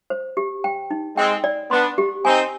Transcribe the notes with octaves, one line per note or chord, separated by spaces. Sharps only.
C5
G4
G5
D#4
G#3 C4 G5
D5
B3 D4 C6
G4
C4 D#4 G#5